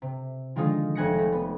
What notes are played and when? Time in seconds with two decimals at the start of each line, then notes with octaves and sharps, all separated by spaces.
0.02 C3
0.56 D3 D#3 F3 G#3 D#4 F4
0.95 F1 G#5 F#6 A#6 C#7
1.18 A3
1.32 B3